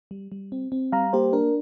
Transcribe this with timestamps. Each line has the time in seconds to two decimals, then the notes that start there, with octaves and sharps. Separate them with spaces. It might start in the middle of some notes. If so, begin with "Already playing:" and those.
0.11 G3
0.32 G3
0.52 C4
0.72 C4
0.92 G3 F5 A#5
1.13 A#3 G4 C5
1.33 D4 A#4